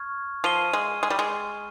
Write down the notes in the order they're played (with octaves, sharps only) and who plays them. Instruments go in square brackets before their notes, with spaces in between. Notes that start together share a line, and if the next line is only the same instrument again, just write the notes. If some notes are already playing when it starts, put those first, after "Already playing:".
Already playing: [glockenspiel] C#6 F6 G#6
[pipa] F3 [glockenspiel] F6 C7 D#7 G7
[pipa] G#3
G#3
G3
G#3